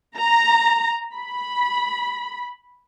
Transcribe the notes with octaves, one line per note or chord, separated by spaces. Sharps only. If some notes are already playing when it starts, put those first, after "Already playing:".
A#5
B5